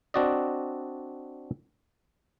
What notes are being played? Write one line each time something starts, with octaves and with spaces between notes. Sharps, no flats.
C4 D4 F#4 D5 D#5